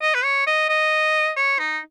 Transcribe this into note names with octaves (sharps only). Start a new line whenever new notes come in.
D#5
B4
C#5
D#5
D#5
C#5
D#4